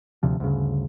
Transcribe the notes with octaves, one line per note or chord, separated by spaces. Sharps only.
D#1 D2 C3 F3
D2 G2 C#3